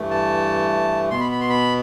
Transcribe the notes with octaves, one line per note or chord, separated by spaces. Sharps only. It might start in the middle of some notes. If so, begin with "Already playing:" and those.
Already playing: G2 E3 A3
A5
B2 B3 C6
B5
B5
C6
B5